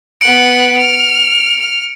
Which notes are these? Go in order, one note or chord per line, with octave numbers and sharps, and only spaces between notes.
B3 F#6 C#7 D7
F6
F6